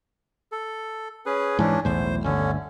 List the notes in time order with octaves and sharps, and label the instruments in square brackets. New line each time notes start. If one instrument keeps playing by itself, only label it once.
[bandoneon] A4
C#4 G#4 B4
[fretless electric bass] G#2 E3 [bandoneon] C#4 D4
[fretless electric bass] B1 E2 A2 [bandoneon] C5
[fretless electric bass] G1 D2 [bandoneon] D3 C#4